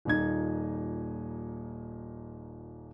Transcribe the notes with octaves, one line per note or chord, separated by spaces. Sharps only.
D#1 A#2 D#4 G#6